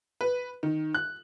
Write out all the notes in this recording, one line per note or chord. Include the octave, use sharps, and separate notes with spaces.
B4
D#3
F#6